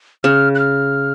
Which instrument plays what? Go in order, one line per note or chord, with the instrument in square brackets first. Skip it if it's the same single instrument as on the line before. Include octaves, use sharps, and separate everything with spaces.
[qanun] C#3 [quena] F6
[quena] F#6
F6